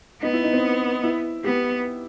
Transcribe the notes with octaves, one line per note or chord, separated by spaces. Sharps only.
B3 D#4
E4
D#4
C4
E4
B3 G4